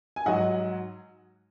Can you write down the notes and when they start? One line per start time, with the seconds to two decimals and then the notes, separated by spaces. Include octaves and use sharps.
0.16 G#5
0.25 G#2 F#3 D#5 F#5